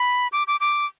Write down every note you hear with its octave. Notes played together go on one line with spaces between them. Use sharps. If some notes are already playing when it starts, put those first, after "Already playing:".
Already playing: B5
D6
D6
D6